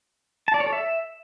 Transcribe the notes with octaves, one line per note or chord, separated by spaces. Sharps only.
A5
D5
C#5
A4
E5